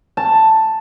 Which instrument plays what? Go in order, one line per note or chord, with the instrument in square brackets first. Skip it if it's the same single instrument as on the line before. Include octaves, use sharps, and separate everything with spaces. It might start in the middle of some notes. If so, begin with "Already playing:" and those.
[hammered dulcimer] A5